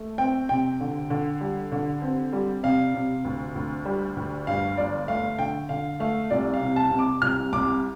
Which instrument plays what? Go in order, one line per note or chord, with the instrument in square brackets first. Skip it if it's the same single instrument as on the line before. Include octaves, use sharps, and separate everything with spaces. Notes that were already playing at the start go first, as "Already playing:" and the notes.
Already playing: [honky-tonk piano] A3
[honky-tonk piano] C4 [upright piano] G5
[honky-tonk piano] C3 [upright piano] G5
[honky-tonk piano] D3
D3
G3
D3
C4
G3
[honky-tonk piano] C3 [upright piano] F5
[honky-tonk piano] C3
D2
D2
G3
D2
[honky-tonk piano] G2 [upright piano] F5
[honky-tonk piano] G1 [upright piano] D5
[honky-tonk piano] A3 [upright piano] F5
[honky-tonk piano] D3 [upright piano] G5
[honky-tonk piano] D3 [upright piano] F5
[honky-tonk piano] A3 [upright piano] F5
[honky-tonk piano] C2 [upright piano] D5
[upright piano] F5
[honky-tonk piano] C3
[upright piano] A5
[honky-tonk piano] C3
[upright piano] D6
[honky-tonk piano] C2 [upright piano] F6
[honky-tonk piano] C2 [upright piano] D6